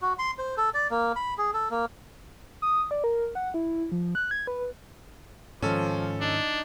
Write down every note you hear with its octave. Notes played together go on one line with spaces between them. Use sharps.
F#4
C6
C5
A4
D5
A#3
B5
G#4
A4
A#3
D#6
D5
A#4
F#5
E4
F3
F#6
G#6
B4
G#2 D#3 F3 C#4 A4
D4 D#4